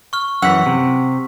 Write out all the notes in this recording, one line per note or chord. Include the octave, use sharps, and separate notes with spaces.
C#6 F6
F#2 E3 F#5 E6 B6
C3